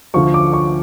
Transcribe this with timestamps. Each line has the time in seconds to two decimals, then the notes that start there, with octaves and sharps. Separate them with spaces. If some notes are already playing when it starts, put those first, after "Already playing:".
0.14 D2 D3 F3 C#6
0.34 D6
0.53 C#6